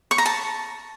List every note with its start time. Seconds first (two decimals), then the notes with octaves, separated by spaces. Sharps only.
0.11 C#6
0.18 A#5
0.26 A5